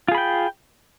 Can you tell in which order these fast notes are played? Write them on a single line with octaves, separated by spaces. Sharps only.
F4 G#4 B5 G5